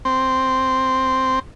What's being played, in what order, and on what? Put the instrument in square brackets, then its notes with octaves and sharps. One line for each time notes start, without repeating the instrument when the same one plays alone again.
[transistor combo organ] C4